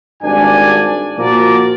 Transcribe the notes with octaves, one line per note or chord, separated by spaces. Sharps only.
G#1 G2 D4 D5 G#5
A#2 F3 F#4 A#4 D5